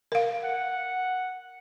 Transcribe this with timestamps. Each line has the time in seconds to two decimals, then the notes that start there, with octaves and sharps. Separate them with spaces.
0.12 A#4 F5
0.44 F#5